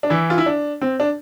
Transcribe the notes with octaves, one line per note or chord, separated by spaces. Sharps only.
D4
E3 E4
F4
E4
D4
C4
D4